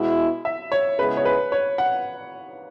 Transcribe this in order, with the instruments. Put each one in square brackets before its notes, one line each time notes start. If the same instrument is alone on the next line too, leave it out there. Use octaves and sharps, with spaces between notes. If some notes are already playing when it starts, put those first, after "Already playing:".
Already playing: [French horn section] B2 G#3 E4
[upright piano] E5
C#5
[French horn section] C#3 G#3 B3 E4 G#4 [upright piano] B4
[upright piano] C#5
B4
C#5
F#5